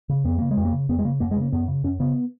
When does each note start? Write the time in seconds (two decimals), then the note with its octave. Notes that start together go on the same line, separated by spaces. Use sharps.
0.09 C#3
0.24 F2 B3
0.38 C#3 A#3
0.51 G#3
0.57 F2
0.65 A#3
0.72 C#3
0.89 F2 B3
0.99 G#3
1.05 C#3 A#3
1.20 F#2 A#3
1.31 G#3
1.36 C#3
1.41 A#3
1.52 F#2 B3
1.68 C#3
1.84 F#2 C#4
2.00 C#3 B3